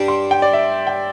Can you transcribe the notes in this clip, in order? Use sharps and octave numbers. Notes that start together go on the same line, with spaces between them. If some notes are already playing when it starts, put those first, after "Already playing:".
Already playing: G2 G3 D4 G4
C6
G5
D5
E5
G5